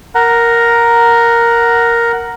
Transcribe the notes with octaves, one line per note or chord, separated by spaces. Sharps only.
A#4 F#5 A#5